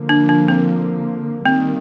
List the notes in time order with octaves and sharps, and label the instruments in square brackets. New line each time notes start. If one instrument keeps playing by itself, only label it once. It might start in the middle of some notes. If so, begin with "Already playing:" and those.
Already playing: [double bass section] D3 F3 A#3
[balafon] D4
D4
C4
[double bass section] D#3 G3 A#3 [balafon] C4